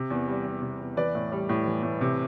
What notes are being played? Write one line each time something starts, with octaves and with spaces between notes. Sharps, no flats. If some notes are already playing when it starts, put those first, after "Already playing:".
Already playing: C3
E2
G3
E2
C3
E2
E3 B4 D5
A2
G3
A2
E3
A2
C3